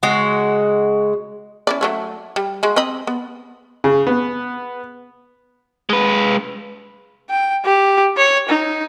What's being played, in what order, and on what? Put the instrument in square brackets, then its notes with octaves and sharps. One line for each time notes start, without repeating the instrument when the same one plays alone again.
[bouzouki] C#3 G#3 F#4
[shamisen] C#4 E4 D5
F#3 A3 E4
G3
G#3 F#4
C4 D#5 B5
B3
[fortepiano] C#3
B3
[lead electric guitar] G#3 B4
[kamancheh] G5
G4
C#5
D#4